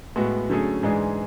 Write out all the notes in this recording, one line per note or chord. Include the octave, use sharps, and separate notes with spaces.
A2 G#3 B3 F#4
D3 F#3 A3 C#4 G#4
G#2 E3 G#3 D4 G#4